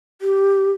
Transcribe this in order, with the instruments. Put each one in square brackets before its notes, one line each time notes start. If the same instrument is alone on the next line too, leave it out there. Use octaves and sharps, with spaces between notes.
[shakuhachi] G4